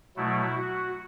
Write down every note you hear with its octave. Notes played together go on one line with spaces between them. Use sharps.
B2 F#3 A3 E4
F#4